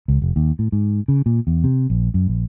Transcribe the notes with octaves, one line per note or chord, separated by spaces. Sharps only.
C#2
F1
D#2
A2
G#2
C#3
A#2
E2
C3
A#1
F#2
A#1